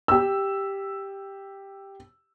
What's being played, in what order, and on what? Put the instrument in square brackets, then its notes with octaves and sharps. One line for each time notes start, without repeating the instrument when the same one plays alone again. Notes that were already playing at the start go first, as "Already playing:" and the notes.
[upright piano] G4 E6